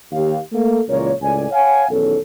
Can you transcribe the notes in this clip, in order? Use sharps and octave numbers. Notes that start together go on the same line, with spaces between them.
D#2 G4 F5
A3 A#3 A4
C#2 A#2 E3 A#4 C#5
C#2 A2 D5 G#5
C#5 F5 F#5 G#5
B1 E2 D#3 C#4 A4